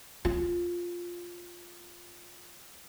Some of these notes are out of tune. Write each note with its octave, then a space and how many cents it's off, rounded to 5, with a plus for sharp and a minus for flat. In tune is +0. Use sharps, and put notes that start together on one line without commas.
F4 +5